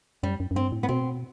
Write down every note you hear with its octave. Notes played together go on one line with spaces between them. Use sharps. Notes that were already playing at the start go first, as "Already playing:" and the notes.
F#2 G3
F#2
F#2
G2 C4
A2
B3
B2 C4